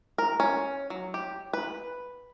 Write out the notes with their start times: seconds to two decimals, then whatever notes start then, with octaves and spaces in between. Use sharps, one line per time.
0.18 A#4
0.40 C#4
0.90 F#3
1.14 G4
1.53 B4